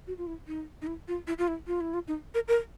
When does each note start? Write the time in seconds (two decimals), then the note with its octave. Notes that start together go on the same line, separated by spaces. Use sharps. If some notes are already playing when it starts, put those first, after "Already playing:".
0.07 F#4
0.18 F4
0.27 E4
0.48 D#4
0.82 D#4
0.87 E4
1.08 F4
1.27 E4
1.38 F4
1.48 E4
1.67 F4
1.81 E4
1.94 F4
2.08 D#4
2.34 A#4
2.48 A#4